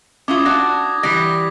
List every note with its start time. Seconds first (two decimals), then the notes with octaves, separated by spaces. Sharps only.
0.28 C#4 E4 F4 D6 D#6 G#6
0.46 D4 F#4 A#6
1.03 E3 G3 A#6 B6